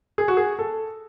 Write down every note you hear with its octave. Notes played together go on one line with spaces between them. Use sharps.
G#4
F#4
G#4
A4